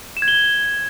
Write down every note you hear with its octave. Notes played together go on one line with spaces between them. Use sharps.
E7
G#6
G7